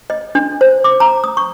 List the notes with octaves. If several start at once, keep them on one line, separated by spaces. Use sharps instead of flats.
D#5
D4
C5
D6
A#5
D#6
C#6